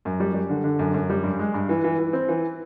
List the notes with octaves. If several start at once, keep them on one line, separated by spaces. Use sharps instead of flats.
F#2
G3
G3
D3
D3
F#2
F#2
G3
G2
G#3
G2
E3
E3
E3
C4
E3